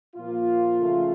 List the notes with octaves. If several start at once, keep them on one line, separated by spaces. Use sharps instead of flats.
A#2 F3 A#3 F4
C#3 F3 A3